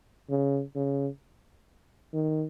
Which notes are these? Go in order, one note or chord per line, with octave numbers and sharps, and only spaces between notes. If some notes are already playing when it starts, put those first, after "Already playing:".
C#3
C#3
D#3